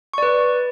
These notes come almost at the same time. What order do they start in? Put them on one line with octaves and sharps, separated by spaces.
C#6 D5 B4